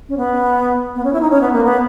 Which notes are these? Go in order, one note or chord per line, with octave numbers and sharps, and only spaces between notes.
C#4
B3
B3
C#4
E4
D#4
C#4
B3
A#3
B3